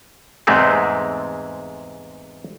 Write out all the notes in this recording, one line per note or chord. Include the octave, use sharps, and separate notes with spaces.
E2 G#2 C3 G#3 A3 C4